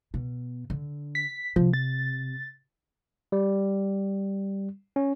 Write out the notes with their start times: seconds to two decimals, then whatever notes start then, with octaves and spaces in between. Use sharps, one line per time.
0.14 B2
0.70 D3
1.15 B6
1.56 C3 F3
1.74 A6
3.32 G3
4.96 C#4